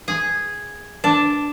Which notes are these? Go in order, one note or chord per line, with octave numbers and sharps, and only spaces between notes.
G#4
D4